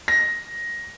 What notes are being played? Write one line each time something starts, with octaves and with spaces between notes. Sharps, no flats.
A#6